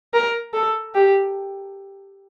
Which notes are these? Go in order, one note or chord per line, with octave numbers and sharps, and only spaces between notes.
A#4
A4
G4